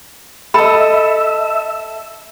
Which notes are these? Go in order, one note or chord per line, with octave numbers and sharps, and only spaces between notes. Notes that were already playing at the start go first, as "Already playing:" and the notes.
A4 D#5 E5 B5